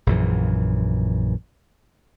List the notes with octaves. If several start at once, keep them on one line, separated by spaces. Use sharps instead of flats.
A#1 F#2 E3